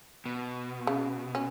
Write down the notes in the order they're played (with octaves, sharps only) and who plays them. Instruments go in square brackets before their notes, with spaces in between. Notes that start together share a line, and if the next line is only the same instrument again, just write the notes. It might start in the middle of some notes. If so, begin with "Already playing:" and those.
[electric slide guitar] B2
[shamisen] C#3
C#4